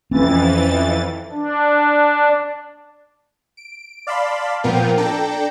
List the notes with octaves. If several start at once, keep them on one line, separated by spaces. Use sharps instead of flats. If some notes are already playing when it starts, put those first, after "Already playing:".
F2 E3 C4 C#4 A6
D4
D7
D5 F5 A5 B5 C6
A#2 F3 B3 F4 A#4 G5
D4 A4 G5 A#5